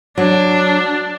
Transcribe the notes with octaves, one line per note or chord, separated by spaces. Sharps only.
F#3 D4